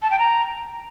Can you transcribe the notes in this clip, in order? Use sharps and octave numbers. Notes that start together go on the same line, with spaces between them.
A5
G5
A#5